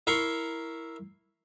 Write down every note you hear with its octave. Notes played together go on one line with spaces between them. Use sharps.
E4 A#4 A#5 C6 C#6